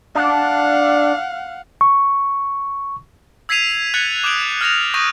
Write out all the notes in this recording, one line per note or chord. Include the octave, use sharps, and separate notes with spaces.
D4 F5 F#5
C#6
E6 G#6 B6 C7 D#7 F7
F#6 G#6 A6 C#7 F#7
D6 D#6 G6 D7 F#7
F6 A6 A#6 F7
C#6 D#6 G6 A#6 D#7